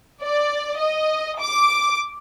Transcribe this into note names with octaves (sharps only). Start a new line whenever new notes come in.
D5
D#5
D6